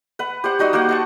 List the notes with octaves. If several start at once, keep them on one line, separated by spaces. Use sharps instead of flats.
B4 F#5
G4 C5 F#5
G3 D#4 F#4 D#5
A#3 F#4 G4 F#5
F#5 A5 C#6